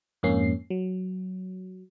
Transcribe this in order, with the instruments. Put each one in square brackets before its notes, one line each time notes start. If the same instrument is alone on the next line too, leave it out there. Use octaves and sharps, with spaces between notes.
[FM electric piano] F2 G#2 A#3 C#4 C7
F#3